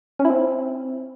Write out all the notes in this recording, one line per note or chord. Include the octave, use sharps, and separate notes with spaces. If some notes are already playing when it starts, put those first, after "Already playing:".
C#4
E4
C4